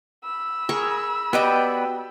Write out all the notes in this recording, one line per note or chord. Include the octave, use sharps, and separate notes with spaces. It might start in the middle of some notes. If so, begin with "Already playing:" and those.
B5 E6
G#4 A#4 C#6
B3 F#4 G4 B4 D5 D#5 G5